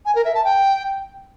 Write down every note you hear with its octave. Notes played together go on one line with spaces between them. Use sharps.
G#5
A#4
E5
A5
G5